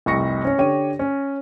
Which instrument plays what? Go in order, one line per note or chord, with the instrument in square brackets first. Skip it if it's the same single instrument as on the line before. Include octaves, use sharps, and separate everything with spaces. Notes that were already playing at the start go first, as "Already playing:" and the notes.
[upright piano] F1 C2 C#6 A#6 C#7
C#4 C#5
D3 G4 C#5 D#7
C#4